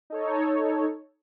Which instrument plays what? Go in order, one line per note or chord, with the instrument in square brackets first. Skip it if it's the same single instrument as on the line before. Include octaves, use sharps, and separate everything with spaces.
[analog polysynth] D#4 A4 C#5